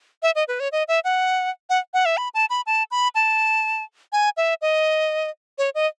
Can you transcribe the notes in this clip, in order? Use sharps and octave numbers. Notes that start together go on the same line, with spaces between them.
E5
D#5
B4
C#5
D#5
E5
F#5
F#5
F#5
E5
B5
A5
B5
A5
B5
A5
G#5
E5
D#5
C#5
D#5